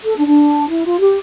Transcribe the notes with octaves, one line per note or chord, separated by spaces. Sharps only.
A4
D4
D4
E4
F4
G4